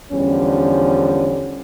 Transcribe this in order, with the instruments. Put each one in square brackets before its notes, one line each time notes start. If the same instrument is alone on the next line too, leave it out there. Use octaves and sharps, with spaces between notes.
[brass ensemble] E2 D3 F3 G3 C#4